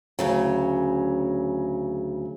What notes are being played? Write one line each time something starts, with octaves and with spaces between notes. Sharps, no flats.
D2 C#3 F#3